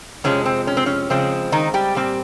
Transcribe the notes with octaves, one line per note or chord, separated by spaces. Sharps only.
F2 C3 F3 G#3 C#4
C4
C#4
C4
C#4
C#3 F3 G#3 C4
D#3 D#4
G3 G4
A#2 G3 C4